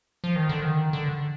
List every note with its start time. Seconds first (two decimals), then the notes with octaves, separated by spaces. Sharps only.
0.24 F3
0.36 D#3
0.49 D3
0.62 D#3
0.93 D3